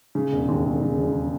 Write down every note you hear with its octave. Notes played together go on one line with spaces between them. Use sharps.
C#3
E1
D#2
E1
C#3
E1